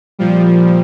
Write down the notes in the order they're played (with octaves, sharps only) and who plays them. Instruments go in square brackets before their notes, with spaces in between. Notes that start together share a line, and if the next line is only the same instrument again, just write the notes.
[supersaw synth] A#2 F3 G3